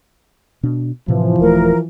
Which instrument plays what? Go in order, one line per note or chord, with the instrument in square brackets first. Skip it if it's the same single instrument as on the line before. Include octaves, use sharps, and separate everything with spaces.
[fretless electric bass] B2 D4
[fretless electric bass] A2 C3 [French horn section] E3 F3
[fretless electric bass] D#1 A3 [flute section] A#4